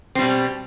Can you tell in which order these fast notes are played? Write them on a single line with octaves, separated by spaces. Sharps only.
C4 G3 B2